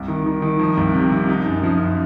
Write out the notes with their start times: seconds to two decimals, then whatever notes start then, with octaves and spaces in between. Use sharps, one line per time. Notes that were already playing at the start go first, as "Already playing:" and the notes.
Already playing: C2
0.08 D#3
0.26 D#3
0.42 D#3
0.59 F3
0.77 C2
0.95 C3
1.12 C3
1.29 D#4
1.46 F#2
1.63 F3
1.80 F#2